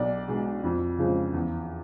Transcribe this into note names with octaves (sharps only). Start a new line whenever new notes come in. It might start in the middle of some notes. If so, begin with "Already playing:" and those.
Already playing: B1 D5
B2 G#3
F2
C#3 F3 G#3
E2